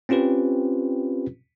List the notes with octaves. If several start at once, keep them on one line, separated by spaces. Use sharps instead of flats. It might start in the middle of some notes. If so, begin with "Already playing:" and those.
C4 C#4 F4 G4 B4